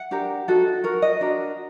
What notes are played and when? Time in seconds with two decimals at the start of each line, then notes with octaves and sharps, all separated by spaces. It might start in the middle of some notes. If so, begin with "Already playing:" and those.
Already playing: F#5
0.11 D4 G4 A#4
0.48 D#4 F#4 A4
0.84 F#4 A#4
1.02 D#5
1.21 D4 F#4 A#4